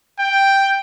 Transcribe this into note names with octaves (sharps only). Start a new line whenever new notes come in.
G5